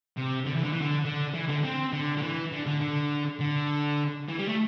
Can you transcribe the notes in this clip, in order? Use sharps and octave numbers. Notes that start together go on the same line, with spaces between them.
C3
D3
E3
D3
E3
D3
D3
E3
D3
C4
D3
D3
E3
D3
D3
D3
D3
E3
G3
A3